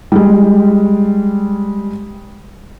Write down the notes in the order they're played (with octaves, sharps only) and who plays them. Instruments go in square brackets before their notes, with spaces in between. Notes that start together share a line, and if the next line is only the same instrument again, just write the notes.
[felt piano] G3 G#3